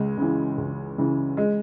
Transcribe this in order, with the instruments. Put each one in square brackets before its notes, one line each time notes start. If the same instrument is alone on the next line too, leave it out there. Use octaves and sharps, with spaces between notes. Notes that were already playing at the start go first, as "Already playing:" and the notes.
Already playing: [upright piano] C#2 G#3
C#3 E3
C#2
C#3 E3
G#3